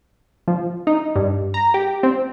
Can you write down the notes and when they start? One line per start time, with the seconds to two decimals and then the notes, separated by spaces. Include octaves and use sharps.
0.48 F3
0.87 D#4
1.16 G2
1.54 A#5
1.74 G4
2.03 C4